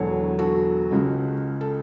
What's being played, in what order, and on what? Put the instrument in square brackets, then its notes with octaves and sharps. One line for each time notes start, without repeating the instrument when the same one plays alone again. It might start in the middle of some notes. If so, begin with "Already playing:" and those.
Already playing: [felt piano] E1 E2 D3 F#3 A4 C#5
F#4 A4
C#2 C#3 G#3
A4